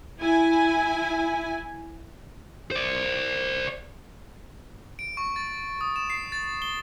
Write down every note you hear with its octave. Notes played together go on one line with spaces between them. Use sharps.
E4 G#5
C5 D5
D7
C#6
A6
D#6
E7
C7
A6
G7